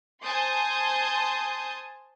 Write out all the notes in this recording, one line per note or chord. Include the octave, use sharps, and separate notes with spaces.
C5 G#5 A5 C6 D#6 G6